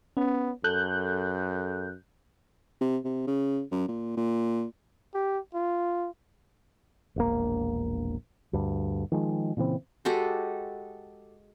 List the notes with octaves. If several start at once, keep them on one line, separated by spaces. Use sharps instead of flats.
B3 C#4
F#2 A4 F#6 G6
C3
C3
C#3
F#2
A#2
A#2
G4
F4
E1 A#1 A#3
D2 G2
D#3 F3 G#3
A#2 C#3 E3 C4
G#3 F#4 G4 A4